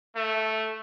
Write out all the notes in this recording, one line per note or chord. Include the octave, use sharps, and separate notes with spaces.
A3